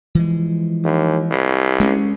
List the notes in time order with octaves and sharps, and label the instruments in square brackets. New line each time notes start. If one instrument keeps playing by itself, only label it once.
[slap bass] E3 F3 G#3
[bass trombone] D#2
C2
[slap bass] G#3 C#4